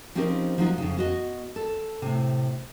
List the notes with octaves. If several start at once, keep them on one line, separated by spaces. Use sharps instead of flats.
F3 C4 C#4 D#4 G4 A#4
F3 F#3 D#4 F4
F2 C#3
B3 F#4 D#5
A4
A2 C3